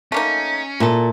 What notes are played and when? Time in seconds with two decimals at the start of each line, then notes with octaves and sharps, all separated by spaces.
0.12 A3 A#3 C#4 D#4
0.80 A#2 E4 A4